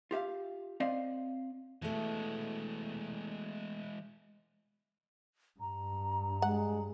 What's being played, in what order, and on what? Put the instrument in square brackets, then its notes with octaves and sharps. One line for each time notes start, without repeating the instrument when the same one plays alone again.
[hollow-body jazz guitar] F4 G4 E5 F5
C4 D5 D#5 F5
[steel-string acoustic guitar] B2 A3 [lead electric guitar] E3 G#3
[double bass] G2 [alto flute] A#5
[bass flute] G#3 [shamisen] F#5